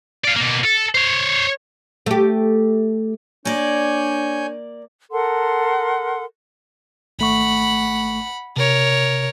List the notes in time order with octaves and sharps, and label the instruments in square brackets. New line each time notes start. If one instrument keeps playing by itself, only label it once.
[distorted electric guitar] D5 F5
B2 A#3
A4
C5 C#5
[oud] A3 G4
[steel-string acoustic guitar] A#3 D5 [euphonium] D4 [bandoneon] C#5 G#5 G6
[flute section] A4 A#4 F#5 C6
[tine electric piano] G#1 A3 C#6 [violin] F#5 B5
[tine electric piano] C3 [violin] A#4 C#5